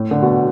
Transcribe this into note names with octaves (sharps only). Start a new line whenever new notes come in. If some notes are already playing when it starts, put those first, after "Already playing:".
Already playing: A2
D3
B2